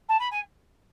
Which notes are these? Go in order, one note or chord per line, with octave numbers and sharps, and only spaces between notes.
A5
B5
G#5